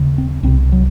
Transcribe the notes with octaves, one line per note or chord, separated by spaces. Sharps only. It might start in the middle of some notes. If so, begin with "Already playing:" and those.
Already playing: D#2 C#3
C4
C2 C3 C4
F#3